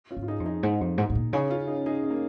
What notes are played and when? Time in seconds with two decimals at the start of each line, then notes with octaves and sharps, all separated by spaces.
0.11 C#4 F4
0.17 G#2
0.23 F4
0.28 D#4 G#4
0.40 F2
0.46 D#4 G#4
0.63 G#2
0.81 F2
0.98 G#2
1.10 G#2
1.15 A#2
1.33 C#3 D#4 G#4
1.50 C#4 F4
1.67 D#4 G#4
1.86 D#4 G#4
2.04 C#4
2.10 A#3